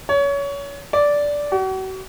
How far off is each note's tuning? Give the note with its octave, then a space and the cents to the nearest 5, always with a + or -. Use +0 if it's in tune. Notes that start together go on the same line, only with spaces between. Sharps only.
C#5 +25
D5 -10
F#4 +40